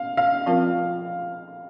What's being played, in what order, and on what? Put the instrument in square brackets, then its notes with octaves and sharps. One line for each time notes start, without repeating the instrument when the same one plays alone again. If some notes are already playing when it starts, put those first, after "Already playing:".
Already playing: [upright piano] F5
F5
[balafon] F3 C4 F4 A#4